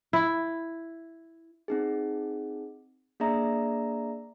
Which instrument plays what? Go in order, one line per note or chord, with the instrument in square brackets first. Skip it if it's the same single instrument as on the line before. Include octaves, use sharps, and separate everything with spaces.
[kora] E4
[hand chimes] C4 D#4 G#4
A#3 D4 G#4 D5 E5 A#5